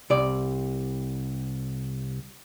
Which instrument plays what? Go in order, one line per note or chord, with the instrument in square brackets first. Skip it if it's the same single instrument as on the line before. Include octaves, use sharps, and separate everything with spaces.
[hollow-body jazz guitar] C2 D5